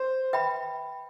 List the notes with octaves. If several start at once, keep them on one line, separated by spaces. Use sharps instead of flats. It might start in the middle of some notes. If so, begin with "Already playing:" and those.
Already playing: C5
B4 E5 G5 B5